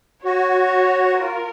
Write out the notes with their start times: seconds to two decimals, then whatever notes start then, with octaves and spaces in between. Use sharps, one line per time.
0.25 F#4 C#5
1.20 F4 A#4